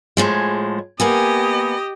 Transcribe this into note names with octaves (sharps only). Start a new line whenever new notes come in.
A2 F3 G#3
A#3 B3 G4 D#5 G#5